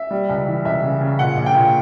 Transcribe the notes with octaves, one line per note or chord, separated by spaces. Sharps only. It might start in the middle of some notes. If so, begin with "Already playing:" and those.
Already playing: E5
G3
C#2
E3
C#2 E5
C#3
C#3
A#2 F#5
A#1
G5
A#2